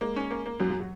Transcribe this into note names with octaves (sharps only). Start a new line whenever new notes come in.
G#3 A#3
C#4
A#3
A#3
F#2 F#3
F#3
F#4